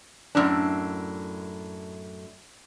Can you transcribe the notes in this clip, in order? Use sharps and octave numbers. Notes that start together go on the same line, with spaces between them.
F#2 A2 D4